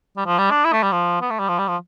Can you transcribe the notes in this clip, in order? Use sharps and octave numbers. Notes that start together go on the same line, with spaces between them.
G3
F3
G3
D4
E4
A3
G3
F3
B3
A3
G3
F3
G3
F3